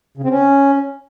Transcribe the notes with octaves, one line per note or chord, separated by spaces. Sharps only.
C#3
C4
C#4